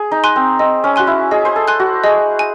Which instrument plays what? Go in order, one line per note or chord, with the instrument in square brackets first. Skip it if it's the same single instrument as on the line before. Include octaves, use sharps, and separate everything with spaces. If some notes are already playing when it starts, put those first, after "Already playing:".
Already playing: [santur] G#4
D#4
[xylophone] G#5 C6 F#6
[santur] C4
[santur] C4 [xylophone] D#5
[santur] C#4
[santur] F#4 [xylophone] G#5 C6 F#6
[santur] E4
[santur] G#4 [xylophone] D#5
[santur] C5
A4
[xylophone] G#5 C6 F#6
[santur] F#4
[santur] G#4 [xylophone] D#5
[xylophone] G#5